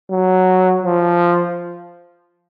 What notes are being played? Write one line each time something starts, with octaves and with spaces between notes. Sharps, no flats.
F#3
F3